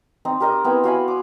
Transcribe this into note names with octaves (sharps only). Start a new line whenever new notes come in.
C4 D#4
G4 A#4 D#5
B3 C4 E4
F#4 F5 G#5 B5
D6